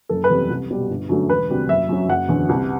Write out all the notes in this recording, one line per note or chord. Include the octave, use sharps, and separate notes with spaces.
F#1 A4
B4
E2 C3 G3
C2
B2 G3
G1
F#2 D3 F#3 A3
E1 B4
D2 C3 G3
F#1 E5
F#2 F#3
F#1 F#5
E2 D3 F#3
C2